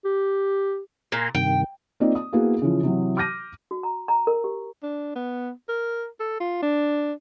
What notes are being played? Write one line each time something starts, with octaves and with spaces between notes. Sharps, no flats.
G4
A#2 G#5 A#5 C6
G2 C3 D#3 G5
A#3 C4 D#4 F4 D5 D#5
D#6
A#3 B3 E4 F#4 G#4 F5
C#3 E3 F3
C3 E3 F#3
D6 F6 G6 A#6 D#7
F#4
A#5
A#5
A#4
G4
D4
B3
A#4
A4
F4
D4